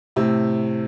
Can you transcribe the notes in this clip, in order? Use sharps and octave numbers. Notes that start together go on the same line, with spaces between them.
A2 C3